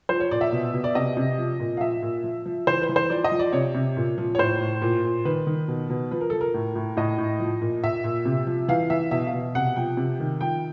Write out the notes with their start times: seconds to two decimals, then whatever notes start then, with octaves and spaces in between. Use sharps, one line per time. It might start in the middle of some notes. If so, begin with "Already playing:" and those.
0.09 F3 C5
0.20 C#5
0.31 A#2 D5
0.41 E5
0.52 B2
0.74 B2
0.84 D5
0.95 C3 D#5
1.17 C3
1.38 F3
1.60 A#2
1.77 F5
1.81 F3 E5
2.02 A#2
2.24 F3
2.46 F3
2.67 E3 C5
2.82 B4
2.89 E3
2.96 C5
3.10 F3 D5
3.24 D#5
3.31 F3
3.39 D5
3.53 C3 C#5
3.75 C3
3.97 A#2
4.18 F3
4.35 C#5
4.39 A2 C5
4.60 A2
4.82 A#2
5.04 A#2
5.25 D#3 B4
5.47 D#3
5.68 B2
5.90 B2
6.11 F3 B4
6.21 A#4
6.30 F3 A4
6.41 A#4
6.54 A2
6.76 A2
6.97 A2 D#5
7.18 A2
7.40 F3
7.62 A#2
7.84 A#2 E5
8.04 A#2
8.26 C3
8.47 F3
8.68 E3 F5
8.90 E3 E5
9.11 B2 E5
9.27 F5
9.33 B2
9.55 C3 F#5
9.76 F3 G5
9.97 C3
10.20 D#3
10.41 F3 G5